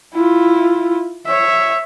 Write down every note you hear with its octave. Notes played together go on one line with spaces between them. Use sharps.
E4 F4
C#5 E5